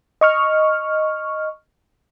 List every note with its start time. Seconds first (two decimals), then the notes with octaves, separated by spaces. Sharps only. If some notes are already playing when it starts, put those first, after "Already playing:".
0.21 D#5 C#6 F6